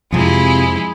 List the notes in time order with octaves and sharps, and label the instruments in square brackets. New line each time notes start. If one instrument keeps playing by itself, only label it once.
[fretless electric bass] F2 [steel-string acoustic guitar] C3 F4 [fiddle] G#3 E4